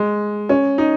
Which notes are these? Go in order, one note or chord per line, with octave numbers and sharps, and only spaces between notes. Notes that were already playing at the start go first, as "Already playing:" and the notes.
Already playing: G#3
C#4
D#4